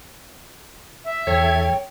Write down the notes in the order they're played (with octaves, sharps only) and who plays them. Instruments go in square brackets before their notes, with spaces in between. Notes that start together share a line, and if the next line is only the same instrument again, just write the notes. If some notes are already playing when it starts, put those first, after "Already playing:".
[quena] E5
[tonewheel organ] E2 A4 G#6 [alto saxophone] C#5 [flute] G5